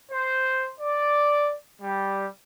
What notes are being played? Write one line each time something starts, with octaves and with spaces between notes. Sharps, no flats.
C5
D5
G3